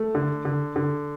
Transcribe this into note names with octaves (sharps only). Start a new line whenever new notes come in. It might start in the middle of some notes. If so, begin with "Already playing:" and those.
Already playing: A3
D3
D3
D3